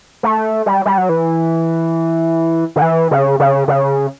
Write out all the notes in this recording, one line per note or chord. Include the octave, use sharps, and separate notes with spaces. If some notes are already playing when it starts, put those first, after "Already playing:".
A3
G3
G3
F#3
E3
D3
E3
C#3
C#3
C#3